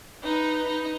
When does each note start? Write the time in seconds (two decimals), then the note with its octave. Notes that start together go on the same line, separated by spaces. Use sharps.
0.22 D#4 B4
0.67 D#4